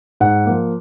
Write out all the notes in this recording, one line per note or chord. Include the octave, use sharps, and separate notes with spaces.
G#2 F#5
F3 A#3